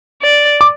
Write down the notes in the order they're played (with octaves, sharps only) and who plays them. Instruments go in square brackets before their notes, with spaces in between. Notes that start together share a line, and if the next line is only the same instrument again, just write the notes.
[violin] D5
[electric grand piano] D6